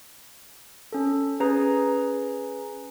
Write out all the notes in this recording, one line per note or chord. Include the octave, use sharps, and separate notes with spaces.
C#4 A4
C#4 G#4 B4 G#5 A#5